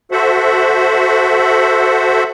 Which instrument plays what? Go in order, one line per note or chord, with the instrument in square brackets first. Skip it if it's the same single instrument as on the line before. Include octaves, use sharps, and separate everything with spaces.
[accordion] F#4 A4 C5 E5 F#5